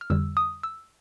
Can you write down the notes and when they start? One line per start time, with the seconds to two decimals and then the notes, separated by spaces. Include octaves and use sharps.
0.01 F6
0.10 F2 D3 G3 E6
0.37 D#6
0.63 E6